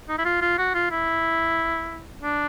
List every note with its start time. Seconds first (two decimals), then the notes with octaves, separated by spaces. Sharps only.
0.09 D#4
0.18 E4
0.25 F4
0.42 F4
0.58 F#4
0.74 F4
0.91 E4
2.22 D4